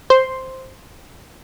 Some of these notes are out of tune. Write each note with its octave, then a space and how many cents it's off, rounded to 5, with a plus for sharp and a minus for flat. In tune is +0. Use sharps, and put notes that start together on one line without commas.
C5 +0 C6 +0